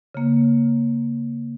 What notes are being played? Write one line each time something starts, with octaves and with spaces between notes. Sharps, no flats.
C#3 A#3